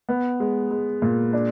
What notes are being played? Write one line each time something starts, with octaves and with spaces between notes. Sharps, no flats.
B3
G#3
G#3
A#2
D4